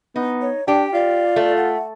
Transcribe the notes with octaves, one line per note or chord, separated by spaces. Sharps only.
B3 D#4
C#5
D4 G4 G5
F4 D5
A3
F#5